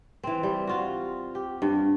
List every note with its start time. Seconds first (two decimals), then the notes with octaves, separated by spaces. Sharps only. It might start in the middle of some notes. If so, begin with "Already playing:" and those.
0.23 E3 C4
0.43 G3
0.67 F4 F#4
1.35 G4
1.62 G2